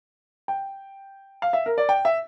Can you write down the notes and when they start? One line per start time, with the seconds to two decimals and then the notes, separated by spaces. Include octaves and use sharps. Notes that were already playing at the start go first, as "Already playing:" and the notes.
0.48 G5
1.42 F5
1.53 E5
1.66 A#4
1.78 D5
1.89 G5
2.05 E5